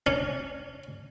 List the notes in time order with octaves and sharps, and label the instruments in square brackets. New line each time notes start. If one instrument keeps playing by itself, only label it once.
[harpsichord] C#4